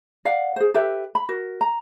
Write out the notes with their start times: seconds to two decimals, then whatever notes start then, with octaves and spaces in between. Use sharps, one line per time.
0.25 D5 F5 F#5
0.56 G#4 C5
0.74 G4 A4 B4 E5
1.15 B5
1.29 F#4 A#4
1.61 A#5